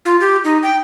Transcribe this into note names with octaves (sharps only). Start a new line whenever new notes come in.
F4
G4
D#4
G5